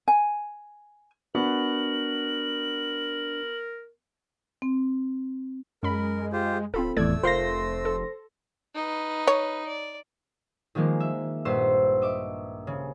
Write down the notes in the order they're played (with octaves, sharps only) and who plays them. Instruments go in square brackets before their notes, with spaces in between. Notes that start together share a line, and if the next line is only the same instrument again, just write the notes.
[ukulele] G#5
[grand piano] B3 F#4 [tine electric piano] D4 [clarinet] A#4 [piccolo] F#7
[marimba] C4
[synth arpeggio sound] F#2 B5 [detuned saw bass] G#3 [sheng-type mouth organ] A#4
[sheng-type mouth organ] F4 G4 C5
[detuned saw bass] D1 [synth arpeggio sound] C4 F4 A4 [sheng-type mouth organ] B5
[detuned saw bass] F1 [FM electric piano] E2 A2 [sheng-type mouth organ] A3 E6 [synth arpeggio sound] A4 D5 G#6
[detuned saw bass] F1 [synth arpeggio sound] F4 A#4 F5 [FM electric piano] C5 C6 A#6
[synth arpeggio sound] A4
[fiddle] D#4 B4
[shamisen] C#5
[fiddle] D5
[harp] D#3 F3 G#3 A#3
E5
A#1 G2 B4 C5 C6 E6
D#5 E5 D6
C#3